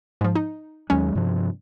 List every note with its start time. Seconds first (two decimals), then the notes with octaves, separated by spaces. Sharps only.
0.21 G#2 F3
0.35 D#4
0.90 D#2 F#3 G#3 C#4
1.15 G2 C3 F3